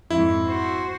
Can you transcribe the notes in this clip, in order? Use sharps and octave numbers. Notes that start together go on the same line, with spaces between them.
F2 G#2 E4
F#4 C5